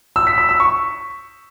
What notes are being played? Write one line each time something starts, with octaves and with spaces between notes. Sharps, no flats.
E6
B6
E6
E6
C#6